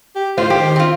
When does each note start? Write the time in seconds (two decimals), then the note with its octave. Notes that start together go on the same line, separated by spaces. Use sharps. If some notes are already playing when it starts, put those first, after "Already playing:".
0.16 G4
0.38 A2 F4 C5
0.50 D#3 G4
0.76 C4 F4